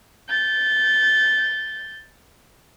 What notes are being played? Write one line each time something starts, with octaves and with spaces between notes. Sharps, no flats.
G6 A6